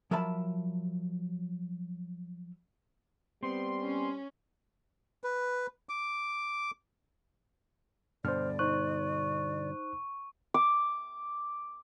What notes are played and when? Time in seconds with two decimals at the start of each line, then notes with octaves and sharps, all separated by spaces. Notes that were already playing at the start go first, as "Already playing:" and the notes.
0.11 F3 F#3 A#4 E5 A5 B5
3.43 G3 B3 C4 C6
3.81 C#4
5.24 B4
5.89 D6
8.25 G2 B2 D3 C5 D5 F6
8.59 D#4 C5 C#6 F#6
10.54 D6